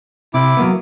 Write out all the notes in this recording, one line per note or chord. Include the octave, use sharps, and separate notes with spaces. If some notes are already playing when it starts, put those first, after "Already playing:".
C3 E4 D6
F#3 A#3 B3